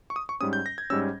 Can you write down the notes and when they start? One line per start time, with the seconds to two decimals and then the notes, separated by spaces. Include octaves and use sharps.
0.10 C#6
0.16 D#6
0.29 C#6
0.41 G#2 G3 C#4 D#6
0.53 G6
0.66 A#6
0.78 G#6
0.90 G#2 G3 C#4 E6